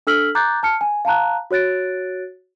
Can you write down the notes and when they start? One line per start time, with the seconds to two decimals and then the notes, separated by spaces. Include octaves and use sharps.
0.07 D4 A4 E6 F6 B6 F#7
0.35 A#5 D6 F#6 G6 A6
0.63 A5 F6 C#7
0.81 G#5
1.05 F5 A5 A#5 F#6
1.51 F#4 C#5 F#6 A6 D7